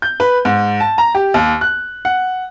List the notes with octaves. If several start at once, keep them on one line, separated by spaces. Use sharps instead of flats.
G6
B4
G#2
A5
A#5
G4
D#2
F#6
F#5